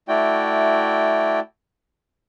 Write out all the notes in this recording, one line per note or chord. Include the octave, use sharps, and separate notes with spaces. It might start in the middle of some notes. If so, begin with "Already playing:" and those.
A3 E4 F#4 D5 G5